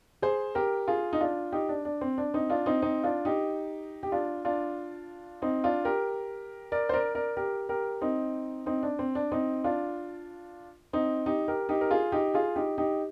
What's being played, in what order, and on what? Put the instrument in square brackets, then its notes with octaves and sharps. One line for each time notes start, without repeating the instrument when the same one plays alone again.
[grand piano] G#4 C5
G4 A#4
F4 G#4
D#4
D4 F4
D#4 G4
D4
D4
C4
D4
C4 D#4
D4 F4
C4 D#4
C4 D#4
D4 F4
D#4 G4
G4
D4 F4
D4 F4
C4 D#4
D4 F4
G4 A#4
A#4 D5
C5
A#4 D5
A#4 D5
G4 A#4
G4 A#4
C4 D#4
C4 D#4
D4
C4
D4
C4 D#4
D4 F4
C4 D#4
D#4 G4
G4 A#4
D#4 G4
A#4
F4 G#4
D#4 G4
F4 G#4
D#4 G4
D#4 G4